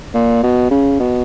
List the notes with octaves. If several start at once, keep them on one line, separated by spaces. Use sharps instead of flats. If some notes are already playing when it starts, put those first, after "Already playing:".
A#2
B2
C#3
B2